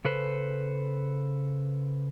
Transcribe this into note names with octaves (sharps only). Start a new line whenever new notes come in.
C#3 A4 B4 C5